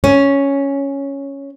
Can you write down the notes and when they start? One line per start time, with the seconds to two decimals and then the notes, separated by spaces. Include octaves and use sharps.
0.04 C#4